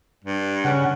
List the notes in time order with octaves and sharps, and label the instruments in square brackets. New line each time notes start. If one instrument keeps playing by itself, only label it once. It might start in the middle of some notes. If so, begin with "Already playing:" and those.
[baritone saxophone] G2
[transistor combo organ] C#3 F#5 [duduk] C#4